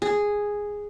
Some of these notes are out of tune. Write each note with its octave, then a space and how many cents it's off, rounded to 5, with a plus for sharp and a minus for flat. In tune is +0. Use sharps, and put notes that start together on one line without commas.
G#4 -5